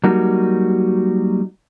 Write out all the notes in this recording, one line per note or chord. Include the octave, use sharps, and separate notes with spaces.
F#3 G3 A#3 D#4 F#4